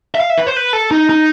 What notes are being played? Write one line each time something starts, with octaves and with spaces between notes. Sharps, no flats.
E5
F5
E5
B4
C5
B4
A4
D#4
D#4